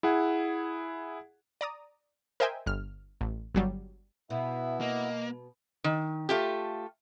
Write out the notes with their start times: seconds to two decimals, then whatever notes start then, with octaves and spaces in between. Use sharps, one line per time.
0.03 E4 G#4 F#5
1.61 D5 A#5 D#6
2.40 A#4 C5 D#5 E5 G5 G#5
2.66 G1 F6
3.21 A1
3.55 G1 F#3 G3
4.30 B2 B3 E4 E5
4.81 A#3 D#5
5.84 D#3
6.29 A3 F4 G4